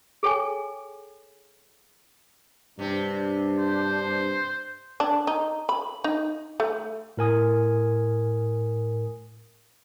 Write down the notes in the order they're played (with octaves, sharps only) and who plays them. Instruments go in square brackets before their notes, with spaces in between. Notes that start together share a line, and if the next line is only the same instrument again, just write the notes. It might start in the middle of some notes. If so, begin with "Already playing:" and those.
[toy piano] G#4 A4 C#5 G5 G#5
[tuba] G2 [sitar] C3 C4 [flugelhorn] D4
[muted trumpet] C5
[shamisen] D4
D#4
B5
D#4
A3
[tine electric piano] A2 A#4 G#5 D#6